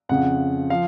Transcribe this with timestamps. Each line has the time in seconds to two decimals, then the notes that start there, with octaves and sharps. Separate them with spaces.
0.09 F2 C#3 F3 F#5
0.70 F3 F5